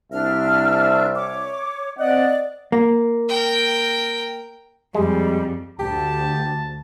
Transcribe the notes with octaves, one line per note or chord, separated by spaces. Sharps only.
C2 D4 E5 F6
C#5 D6
C4 D5 D#5 F#5
A#3
A#4 G5
F2 G3 G#3
D2 G4 A5